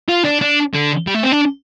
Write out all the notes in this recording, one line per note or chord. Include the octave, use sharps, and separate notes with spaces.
F4
D4
D4
D3
G3
A3
C4
D4